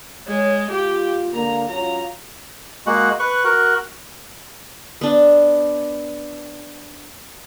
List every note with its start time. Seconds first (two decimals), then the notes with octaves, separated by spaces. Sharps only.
0.28 G#3 C#5
0.71 F4 G4
1.34 D3 G#3 A#3 A#5
1.68 F#3 C#4 F4 A#5
2.86 G#3 A#3 F#4 F#5
3.20 B4 C#6 F#6
3.44 F#4 A#4 F#5
5.01 B3 D4